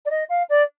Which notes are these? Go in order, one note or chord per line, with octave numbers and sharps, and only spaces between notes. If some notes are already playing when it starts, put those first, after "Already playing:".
D5
D#5
F5
D5